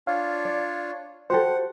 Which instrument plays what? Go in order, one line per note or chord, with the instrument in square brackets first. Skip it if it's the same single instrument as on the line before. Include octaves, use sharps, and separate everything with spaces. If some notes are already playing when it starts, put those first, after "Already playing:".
[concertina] D4 F4 C#5 [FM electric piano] F5
[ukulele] D5
[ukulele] F#4 G4 A4 [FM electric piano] C5 [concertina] F#5